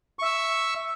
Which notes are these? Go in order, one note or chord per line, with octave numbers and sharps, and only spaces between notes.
E5 C#6 E6